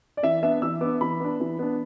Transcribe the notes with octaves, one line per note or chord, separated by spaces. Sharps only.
D5
E3 E5
B3 D4 E5
E3 E6
B3 D4 D6
E3 B5
B3 D4
E3
B3 D4